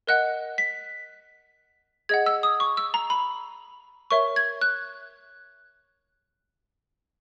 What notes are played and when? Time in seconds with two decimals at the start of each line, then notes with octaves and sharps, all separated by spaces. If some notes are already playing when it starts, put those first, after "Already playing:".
0.07 A#4 D#5 F#5 F#6
0.58 B6
2.09 G#4 D#5 F#5 G#6
2.26 E6
2.43 D#6
2.60 C#6
2.77 E6
2.94 A#5
3.10 B5
4.11 A#4 C#5 E5 C#6
4.36 G#6
4.61 F#6